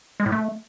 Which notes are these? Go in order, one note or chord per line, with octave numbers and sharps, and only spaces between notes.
G#3
A2
A3